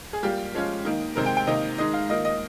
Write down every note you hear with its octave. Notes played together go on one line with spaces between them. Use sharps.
G#4
G3 A#3 F4 G4
F3 G#3 C#4 F4
D#3 A#3 D#4
C3 D#3 G#3 C4 A#4
G5
G5
C3 D#3 A#3 D#4 D#5
D#3 G#3 D#4 D#5
F5
D#3 A#3 F4 D#5
D#5